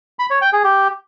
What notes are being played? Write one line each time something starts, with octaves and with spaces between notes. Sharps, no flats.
B5
C#5
G5
G#4
G4